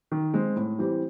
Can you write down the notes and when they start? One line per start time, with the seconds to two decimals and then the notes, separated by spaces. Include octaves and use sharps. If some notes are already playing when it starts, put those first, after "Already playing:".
0.12 D#3
0.34 G#3 C4
0.56 A2
0.79 E3 G3 C4